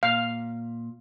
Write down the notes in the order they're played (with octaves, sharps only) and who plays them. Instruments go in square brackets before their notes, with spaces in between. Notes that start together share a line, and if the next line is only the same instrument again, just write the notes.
[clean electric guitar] A#2 [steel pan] F5